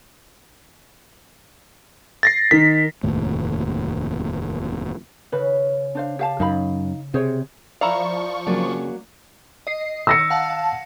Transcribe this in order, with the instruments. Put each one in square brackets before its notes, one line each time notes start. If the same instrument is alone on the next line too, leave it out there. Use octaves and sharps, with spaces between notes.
[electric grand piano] A6 A#6 C7
[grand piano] D#3 D#4 [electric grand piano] B6
[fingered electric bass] F1 D#2 A2
[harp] C#3 [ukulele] B4
[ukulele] D4 C5 F5
G4 F5 A5
[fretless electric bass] F#2 [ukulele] D#4 F5 B5
[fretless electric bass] C3 [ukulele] G#4 C5 C#5
[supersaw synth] F3 C#6 [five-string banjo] E4 A#4 F5 [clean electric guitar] D5
[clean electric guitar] F2 C#3 G#4 [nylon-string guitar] F#3 A#3 F4 [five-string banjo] D5
[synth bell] D#5 C7
[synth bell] D#3 [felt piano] E6 A#6 C#7
[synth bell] F5 F#5 A5